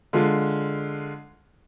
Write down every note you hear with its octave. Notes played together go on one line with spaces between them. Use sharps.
D3 G#3 F4